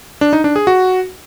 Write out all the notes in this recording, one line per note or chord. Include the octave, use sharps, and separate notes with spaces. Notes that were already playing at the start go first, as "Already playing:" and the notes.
D4
D#4
D4
G#4
F#4